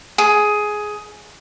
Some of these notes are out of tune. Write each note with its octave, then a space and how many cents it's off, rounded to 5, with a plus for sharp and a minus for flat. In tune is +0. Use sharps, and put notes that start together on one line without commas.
G#4 +10